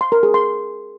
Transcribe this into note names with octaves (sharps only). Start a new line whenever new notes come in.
C6
A#4
G#4
C6